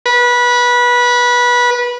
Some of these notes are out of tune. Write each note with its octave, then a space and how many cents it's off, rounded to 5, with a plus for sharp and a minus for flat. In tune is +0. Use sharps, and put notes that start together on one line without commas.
B4 -20